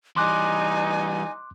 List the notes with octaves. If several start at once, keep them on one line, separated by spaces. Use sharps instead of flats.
E3 G3 D#4 G#5 C6 D6 F#6